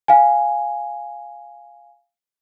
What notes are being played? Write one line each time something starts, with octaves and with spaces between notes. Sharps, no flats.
F5 G#5